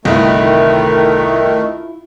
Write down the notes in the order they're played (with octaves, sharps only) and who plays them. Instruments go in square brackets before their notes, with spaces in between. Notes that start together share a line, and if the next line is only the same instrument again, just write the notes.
[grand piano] G1 C2 D#5 [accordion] D#3 A3 [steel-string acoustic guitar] E4 F4